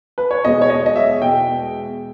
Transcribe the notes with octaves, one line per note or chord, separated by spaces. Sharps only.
B4
C#5
E2 B2 G#3 D#5
C#5
D#5
D#5
E5
E2 B2 G#3 G5